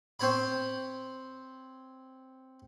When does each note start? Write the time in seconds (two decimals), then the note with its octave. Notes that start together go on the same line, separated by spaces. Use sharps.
0.20 C4 C5 C#5 B5